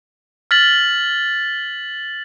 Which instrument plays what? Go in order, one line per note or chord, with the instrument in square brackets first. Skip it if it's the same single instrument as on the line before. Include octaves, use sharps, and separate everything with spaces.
[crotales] F6 A6 B6 F#7